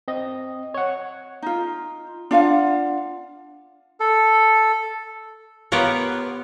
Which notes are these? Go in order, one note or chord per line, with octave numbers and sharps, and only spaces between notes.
C4 D#5
C#5 F#5
D#4 F4
D4 F4 F5 F#5
A4
B3 F4 G4 A#4 C#5